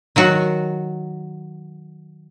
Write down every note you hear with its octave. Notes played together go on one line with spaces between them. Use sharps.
D#3 F#3 F#4